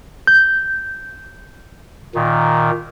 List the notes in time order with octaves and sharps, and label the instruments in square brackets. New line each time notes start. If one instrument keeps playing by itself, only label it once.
[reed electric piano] G6
[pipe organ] A#2 D#3